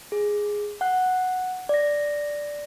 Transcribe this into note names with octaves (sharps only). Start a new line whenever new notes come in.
G#4
F#5 F#6
D5 A#6